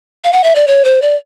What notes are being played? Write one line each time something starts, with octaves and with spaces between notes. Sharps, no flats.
F5
F#5
E5
D5
C#5
C5
D5